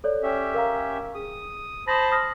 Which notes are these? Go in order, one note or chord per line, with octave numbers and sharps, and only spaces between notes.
A4 C#5 D5
C#4 G4 E5
A#4 F5 A#5
G#4 D#6
C5 A5 B5 D#6 A#6
D#6 F6 A#6